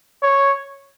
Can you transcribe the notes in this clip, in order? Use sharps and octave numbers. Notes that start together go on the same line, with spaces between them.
C#5